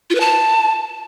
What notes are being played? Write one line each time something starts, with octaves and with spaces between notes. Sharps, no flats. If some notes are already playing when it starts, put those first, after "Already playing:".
F4
B4
A5